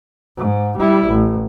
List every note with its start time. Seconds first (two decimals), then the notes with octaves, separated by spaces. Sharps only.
0.37 G#2
0.78 G3 E4
1.10 A1